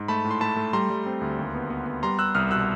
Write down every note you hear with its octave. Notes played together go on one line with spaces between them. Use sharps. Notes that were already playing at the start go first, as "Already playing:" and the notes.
Already playing: G#2
A3 A5 B5
A2
C6
A3 A5 B5
A3
G3 A#5 C6
G3
C4
D2
D#2
B3
B3
B3
G3 A#5 C6
G3 E6 F#6
C2 D#6 F6
B2 E6 F#6